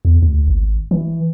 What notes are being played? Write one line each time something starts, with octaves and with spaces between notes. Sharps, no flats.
E2
D2
G#1
E3